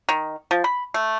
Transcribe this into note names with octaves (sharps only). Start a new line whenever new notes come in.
D#3
F3
B5
A3